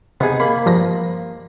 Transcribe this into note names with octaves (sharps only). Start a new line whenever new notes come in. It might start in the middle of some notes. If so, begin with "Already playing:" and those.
C3 B3 D#4 G#4
A#3 B5
G2 F3 A#6